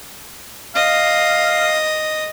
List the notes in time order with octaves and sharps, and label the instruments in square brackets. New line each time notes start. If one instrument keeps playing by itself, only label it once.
[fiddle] D#5 [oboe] F5